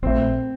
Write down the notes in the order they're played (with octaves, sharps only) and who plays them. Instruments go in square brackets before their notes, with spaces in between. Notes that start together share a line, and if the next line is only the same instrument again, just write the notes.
[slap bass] A#1 A#2 A3 [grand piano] C4